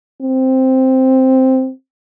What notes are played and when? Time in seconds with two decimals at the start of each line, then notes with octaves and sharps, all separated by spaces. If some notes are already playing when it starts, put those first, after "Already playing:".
0.22 C4